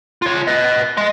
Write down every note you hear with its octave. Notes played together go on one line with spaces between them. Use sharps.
F4 C#5
B4 D#5
D#5 C6